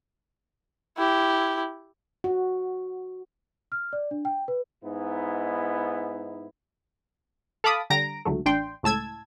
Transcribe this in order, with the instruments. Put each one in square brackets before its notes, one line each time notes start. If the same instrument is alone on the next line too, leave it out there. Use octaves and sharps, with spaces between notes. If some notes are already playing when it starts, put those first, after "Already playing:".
[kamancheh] E4 G4
[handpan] F#4
[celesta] F6
D5
D4
G5
B4
[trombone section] G#2 B3 D#4 E4
[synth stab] A4 F5 A5 B5 D6 D#6
D3 G3 A#5 A#6 D7
C#2 D3 F#3 A3
A1 D4 G5 C6
C#2 A2 A5 E6 G#6